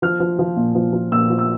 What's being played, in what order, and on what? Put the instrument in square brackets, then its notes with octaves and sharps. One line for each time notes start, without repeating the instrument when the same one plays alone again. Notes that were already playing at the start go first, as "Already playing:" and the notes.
[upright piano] F3 F6
F3
F3
A#2
F3
F3
A#2 E6
F3
E6